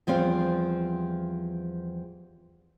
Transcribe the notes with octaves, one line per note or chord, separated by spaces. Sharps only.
E2 F3 G3 C4 F5